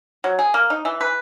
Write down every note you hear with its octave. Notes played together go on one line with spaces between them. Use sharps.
F#3
G#4
A#3
D#4
E3
B4